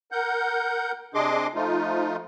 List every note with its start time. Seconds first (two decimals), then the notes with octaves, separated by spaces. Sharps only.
0.12 A#4 F#5 G6
1.14 C3 D4 G#4 D#5 C6 D6
1.55 F3 A3 D#4 F4